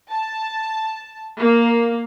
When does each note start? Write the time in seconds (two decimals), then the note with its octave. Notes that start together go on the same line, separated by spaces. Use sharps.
0.10 A5
1.41 A#3